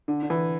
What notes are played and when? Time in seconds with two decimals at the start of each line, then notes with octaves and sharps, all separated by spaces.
0.08 D3
0.23 D3
0.30 E3